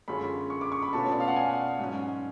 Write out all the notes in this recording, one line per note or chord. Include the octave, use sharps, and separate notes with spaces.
F#2 D3 G#3 C#4 F4 B5
C#6
D6
C#6
B5
B2 A3 C#4 F4 A5
C#5
D5
F5
F#5
G#5
G#2 F#3 C#4